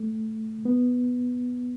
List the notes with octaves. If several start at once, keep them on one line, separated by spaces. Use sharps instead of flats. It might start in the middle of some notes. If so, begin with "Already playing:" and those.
Already playing: A3
B3